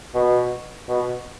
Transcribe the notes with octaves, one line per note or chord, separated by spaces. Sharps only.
B2
B2